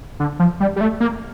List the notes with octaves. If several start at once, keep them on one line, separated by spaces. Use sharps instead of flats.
D3
F3
G3
G3
A3
A#3